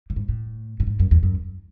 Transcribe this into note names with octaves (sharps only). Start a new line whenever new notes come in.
A2
G#2
A2
A2
G#2
F#2
E2
F#2